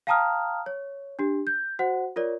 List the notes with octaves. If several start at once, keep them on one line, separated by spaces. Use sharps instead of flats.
F5 G5 A5 A#5 D#6 F6
C#5
D4 G4
G6
F#4 C5 F#5
F4 A#4 C#5 D5